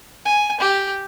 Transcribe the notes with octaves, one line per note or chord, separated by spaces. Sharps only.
G#5
G4